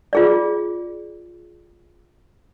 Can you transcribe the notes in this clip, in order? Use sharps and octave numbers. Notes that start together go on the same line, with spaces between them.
F4 G#4 D5